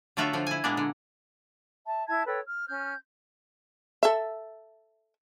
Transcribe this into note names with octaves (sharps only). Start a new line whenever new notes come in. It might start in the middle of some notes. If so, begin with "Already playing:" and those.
D3 F#3 A3 F4 F#4 E5
D3 F3 F4
E4 G#5
A#2 G#3 A#3 B3 D4
D3
E5 A5
E4 E5 A5 G#6
A4 B4 C#5 G5
F6
C#4 F6 G6
A4 E5